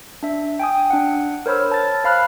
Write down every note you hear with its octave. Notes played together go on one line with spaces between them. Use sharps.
D4 E5
G5 G#5 D#6
D4 F#5
A#4 C5 C#5 B5 E6 F6
A5 A6
C5 F5 B5 F6 F#6